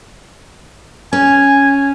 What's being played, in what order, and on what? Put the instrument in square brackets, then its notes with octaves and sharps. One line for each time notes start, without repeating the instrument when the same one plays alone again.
[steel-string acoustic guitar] C#4 [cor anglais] G#5